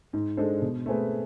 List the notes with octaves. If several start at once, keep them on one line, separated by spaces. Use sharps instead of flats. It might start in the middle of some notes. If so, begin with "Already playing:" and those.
G#2
G#3 D4 A4 C5
B2
A3 C4 G#4 B4